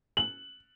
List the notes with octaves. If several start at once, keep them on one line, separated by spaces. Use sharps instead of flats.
F#7